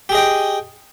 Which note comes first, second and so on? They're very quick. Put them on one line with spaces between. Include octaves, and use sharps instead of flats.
G4 G#4 D#5 G5